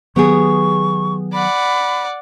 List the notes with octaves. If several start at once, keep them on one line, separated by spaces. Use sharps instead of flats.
D#3 F#3 B3 G4 G#4 C#6
D5 F#5 B5